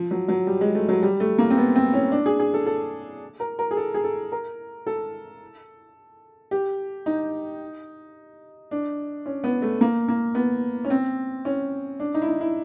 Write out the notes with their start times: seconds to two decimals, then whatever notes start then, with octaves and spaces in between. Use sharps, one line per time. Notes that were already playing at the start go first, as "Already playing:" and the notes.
Already playing: F3
0.11 F#3
0.28 F#3
0.47 G3
0.61 G#3
0.75 A3
0.88 F#3
1.03 G3
1.20 A3
1.38 A#3
1.50 C4
1.57 B3
1.76 C4
1.94 C#4
2.12 D4
2.26 G#4
2.39 G#4
2.54 A4
2.67 A4
3.40 A#4
3.59 A#4
3.71 G#4
3.77 A4
3.94 G#4
4.04 A4
4.32 A#4
4.87 A4
6.51 G4
7.06 D#4
8.71 D4
9.26 C#4
9.44 B3
9.62 A3
9.81 A#3
10.08 A#3
10.35 B3
10.85 C#4
10.90 C4
11.45 C#4
12.00 D4
12.14 D#4
12.22 E4
12.28 D#4
12.41 E4